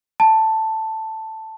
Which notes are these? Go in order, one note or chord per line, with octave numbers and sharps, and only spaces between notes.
A5